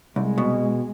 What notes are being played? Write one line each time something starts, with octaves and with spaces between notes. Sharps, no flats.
C2 G#3
B2